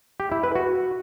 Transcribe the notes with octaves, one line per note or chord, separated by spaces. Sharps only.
G4
E4
B4
F#4